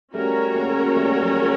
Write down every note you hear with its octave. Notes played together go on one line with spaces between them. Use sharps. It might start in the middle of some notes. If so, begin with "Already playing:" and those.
G3 A3 C#4 F#4 A#4 C#5
G#3 A#3
G3 A3
F#3 G#3